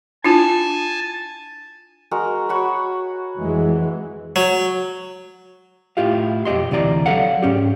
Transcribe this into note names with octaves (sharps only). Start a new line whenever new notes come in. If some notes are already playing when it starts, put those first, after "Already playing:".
D4 E4 F4 G#5 A5
G#3 F#4 A#4
F#4 C#5 B5
F2 E3 G#3
F#3
A2 E4 F4 G4 F5
B1 F2 G4 D#5 C6
D2 C3 E3 D5 A#5
F#3 A4 D5 F5 F#5
G#2 C#4 G4